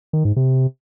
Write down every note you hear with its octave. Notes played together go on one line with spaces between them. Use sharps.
D#3
G#2
C3